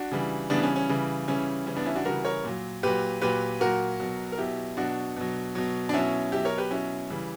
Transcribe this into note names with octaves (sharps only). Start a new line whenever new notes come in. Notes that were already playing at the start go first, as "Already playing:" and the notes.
Already playing: D4 F#4
C#3 E3 G3
C#3 E3 G3 B3 D4
C#4
C#4
C#3 E3 G3
C#3 E3 G3 C#4
C#3 E3 G3 C#4
B3 D4
C#4 E4
D4 F#4
C#3 E3 G3 F#4 A#4
A#4 C#5
A#2 F#3
A#2 F#3 G4 B4
A#2 F#3 G4 B4
A#2 F#3 F#4 A#4
B2 F#3
A#4
B2 F#3 E4 G4
B2 F#3 D4 F#4
B2 F#3
B2 F#3
D4
B2 F#3 C#4 E4
B2 F#3 E4 G4
A#4 C#5
G4 B4
B2 F#3 C#4 E4
C#3 E3 G3